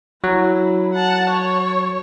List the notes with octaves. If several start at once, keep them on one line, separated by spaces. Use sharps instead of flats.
F#3 E4
F#5 A5
C#5